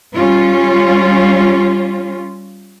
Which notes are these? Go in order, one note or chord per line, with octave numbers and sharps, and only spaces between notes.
G3 C#4 F4